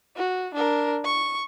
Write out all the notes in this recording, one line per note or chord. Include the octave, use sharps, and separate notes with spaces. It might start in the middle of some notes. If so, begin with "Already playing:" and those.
F#4
D4 A#4
C#6